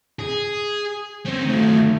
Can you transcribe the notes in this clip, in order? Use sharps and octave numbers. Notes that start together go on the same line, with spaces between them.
G#4
C4 C#4
D#3 F#3 A3